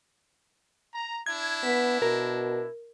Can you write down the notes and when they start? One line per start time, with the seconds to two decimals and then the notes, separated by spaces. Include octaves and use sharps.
0.94 A#5
1.26 D4 E4 G#6
1.63 B3 B6
2.02 B2 A#4